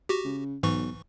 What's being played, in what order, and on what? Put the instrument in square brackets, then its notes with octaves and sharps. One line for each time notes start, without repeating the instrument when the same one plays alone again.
[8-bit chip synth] F#4 G4
[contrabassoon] C#3
[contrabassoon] B1 [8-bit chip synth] G#2 E3 C#6